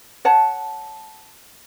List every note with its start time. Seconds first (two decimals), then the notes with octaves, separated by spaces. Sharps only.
0.25 C#5 F#5 A5